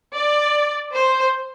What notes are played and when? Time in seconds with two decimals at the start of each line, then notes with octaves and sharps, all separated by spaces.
0.14 D5
0.95 C5